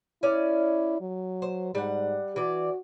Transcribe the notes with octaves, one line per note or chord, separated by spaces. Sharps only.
C#4 E4 D5
F#3
C5
G#2 G3 F#5
E3 F#4 D5